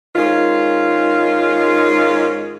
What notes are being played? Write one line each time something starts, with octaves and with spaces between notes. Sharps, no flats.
G#2 D#3 C#4 F4